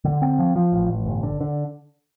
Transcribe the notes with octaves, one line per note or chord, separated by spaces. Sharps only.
D3
C4
F3
F3
A1
A1
G1
D3
D3